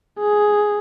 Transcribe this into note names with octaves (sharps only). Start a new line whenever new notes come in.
G#4